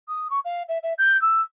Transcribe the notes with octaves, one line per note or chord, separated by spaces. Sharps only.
D#6
C#6
F5
E5
E5
G6
E6